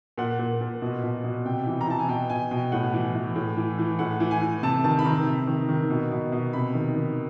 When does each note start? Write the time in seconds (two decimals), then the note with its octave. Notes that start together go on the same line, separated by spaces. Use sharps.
0.18 A#2 F#5
0.39 A#2
0.61 A#2
0.82 B2
1.03 B2
1.24 B2
1.45 C3 G5
1.66 E3
1.81 A#5
1.87 E3 A5
1.99 G#5
2.09 B2 G5
2.30 B2 G#5
2.51 B2 G5
2.72 A2 F#5
2.94 E3
3.15 E3
3.36 A2
3.57 E3
3.79 E3
3.99 A2 F#5
4.20 E3
4.31 G#5
4.42 E3
4.63 C3 A5
4.84 D#3 A5
4.99 B5
5.05 D#3 A#5
5.26 C3
5.47 D#3
5.69 D#3
5.90 B2
6.11 B2
6.32 B2
6.53 C3 B5
6.74 D#3
6.96 D#3